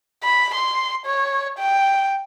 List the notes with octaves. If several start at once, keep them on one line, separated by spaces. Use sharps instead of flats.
B5
C6
C#5
G5